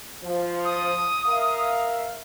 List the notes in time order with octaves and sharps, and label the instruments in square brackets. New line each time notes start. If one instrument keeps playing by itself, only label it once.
[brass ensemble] F3
[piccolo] D#6
[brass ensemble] A#4 E5 F5